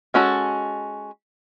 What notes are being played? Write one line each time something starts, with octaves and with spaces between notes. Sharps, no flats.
G#3 C#4 F#4 A4